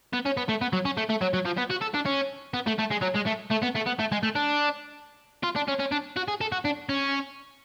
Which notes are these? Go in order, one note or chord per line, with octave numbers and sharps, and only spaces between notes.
B3
C#4
B3
A3
B3
F#3
C#4
A3
A3
F#3
F#3
F3
B3
F#4
A4
D4
C#4
B3
A3
A3
G#3
F#3
G#3
A3
A3
B3
A3
B3
A3
G#3
A3
D4
F4
D4
C#4
C#4
D4
F#4
G#4
A4
F#4
D4
C#4